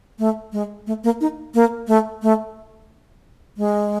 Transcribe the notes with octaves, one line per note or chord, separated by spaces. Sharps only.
A3
G#3
A3
A#3
D#4
A#3
A3
A3
G#3